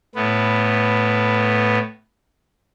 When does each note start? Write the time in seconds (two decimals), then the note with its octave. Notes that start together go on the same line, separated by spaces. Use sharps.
0.15 A2 B3